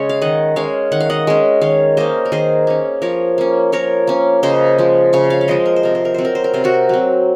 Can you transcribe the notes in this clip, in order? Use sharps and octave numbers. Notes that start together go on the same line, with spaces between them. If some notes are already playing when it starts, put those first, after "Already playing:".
Already playing: C#3 G#3 C#4 C#5
F5
D#3 D#5 F#5
G#3 C#4 C#5 F5
D#3 F#5
F5
D#5 F#5
G#3 C#4
D#3 C#5 F5
A#3 C#4 C5 D#5
A#4
D#3 G#4 C5
A#3 C#4
F3 A#4 C#5
A#3 C#4
F3 A#4 C#5
A#3 C#4
C#3 C5 D#5
F3 G#3
C#3 C#5 F5
C#5 F5
F5
F3 G#3 C5 D#5
A#4
C5
C3 A#4
C5
A#4
F#3 C4 C5
A#4
C5
A#4
C3 C5
F#4 A#4
F#3 C4